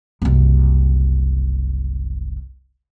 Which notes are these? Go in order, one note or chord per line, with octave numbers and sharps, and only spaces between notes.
F#1 C2